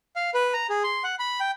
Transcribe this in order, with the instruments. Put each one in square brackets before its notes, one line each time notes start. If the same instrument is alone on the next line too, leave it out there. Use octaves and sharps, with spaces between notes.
[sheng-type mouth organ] F5
B4
A#5
G#4
C6
F#5
B5
G5